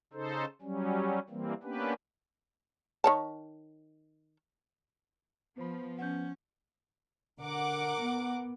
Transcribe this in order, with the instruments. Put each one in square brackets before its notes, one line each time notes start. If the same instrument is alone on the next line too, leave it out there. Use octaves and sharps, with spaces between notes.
[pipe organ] C#3 D#4 A4 C5
F#3 G3 C#4
E3 G3 A#3 C4
A#3 B3 C#4 D4 G4 B4
[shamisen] D#3 C#5 A5
[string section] F3 [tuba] B3 [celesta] C5 B5
[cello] C#4 [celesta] F#5 G6
[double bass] D3 [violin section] A#4 F#5 D6
[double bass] B3